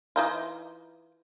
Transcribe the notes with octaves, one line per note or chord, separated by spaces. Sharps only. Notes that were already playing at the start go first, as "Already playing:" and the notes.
E3 D#4 F4